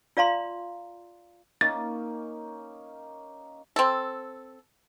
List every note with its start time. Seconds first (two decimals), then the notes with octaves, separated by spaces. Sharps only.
0.17 F4 D5 F5 A#5 C6
1.61 A#3 C#4 D#4 A6
3.76 C4 A4